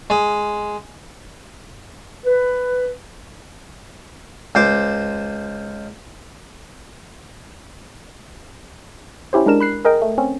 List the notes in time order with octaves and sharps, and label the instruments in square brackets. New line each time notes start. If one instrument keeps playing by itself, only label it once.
[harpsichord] G#3
[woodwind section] B4
[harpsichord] C#2 C5 D6
[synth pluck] C#4 E4 G4 C5
G#3 D4 A#4 E7
B5 F#6 C7
G#4 A#4 D#5 G5
A3
C4 C#4